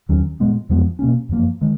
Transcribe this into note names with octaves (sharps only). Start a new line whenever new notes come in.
D#2 D#3 F#3 C#4
A#2 G#3 B3
F2 F3 G#3 B3
B2 A#3 C#4
F#2 F3 A#3
D#3 G#3